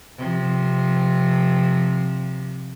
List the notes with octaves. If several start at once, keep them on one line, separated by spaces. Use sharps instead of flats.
C3 F3